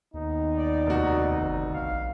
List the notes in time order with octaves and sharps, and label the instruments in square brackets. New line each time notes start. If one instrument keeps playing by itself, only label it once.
[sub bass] D#2 [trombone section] D#3 B3 D#4
[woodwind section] D5
[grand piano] F1 F#4
[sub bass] G1
[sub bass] A#1 [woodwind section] F5